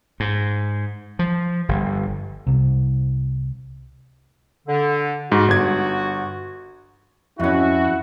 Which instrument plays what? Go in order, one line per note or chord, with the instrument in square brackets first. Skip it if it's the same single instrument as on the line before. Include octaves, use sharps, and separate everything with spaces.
[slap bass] G#2
F3
G1
[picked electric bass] C2 C3
[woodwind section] D3
[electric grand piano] G#2 [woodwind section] F#4
[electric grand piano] G1 G#6
[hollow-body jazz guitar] F2 C#4 [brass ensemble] E4 F#4